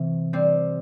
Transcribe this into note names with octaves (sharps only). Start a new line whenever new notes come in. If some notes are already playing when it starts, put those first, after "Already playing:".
Already playing: C3 E3 C4
G3 C4